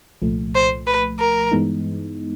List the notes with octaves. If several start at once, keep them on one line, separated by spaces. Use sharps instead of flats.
C2 A#2 F3 A3
C5
B4
A#4
G2 E3 G#3 B3 D#4